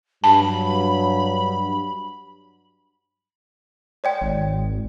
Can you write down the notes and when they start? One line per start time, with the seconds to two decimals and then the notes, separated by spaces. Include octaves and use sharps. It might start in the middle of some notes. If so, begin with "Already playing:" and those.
0.24 G2 F#3 A5 B5
4.04 C#5 D5 G5
4.21 G#1